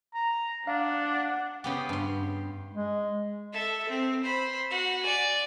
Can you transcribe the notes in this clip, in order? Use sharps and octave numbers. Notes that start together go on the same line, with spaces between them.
A#5
D4 F5 F#5
C#3 B3 G4
G2 C6
G#3
A4 E5
C4
C5 B5
F#4 F#5
D5 G#5